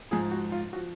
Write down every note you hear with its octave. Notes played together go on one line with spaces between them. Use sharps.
G#2 F3 G#4
F#4
F4
F3 F#4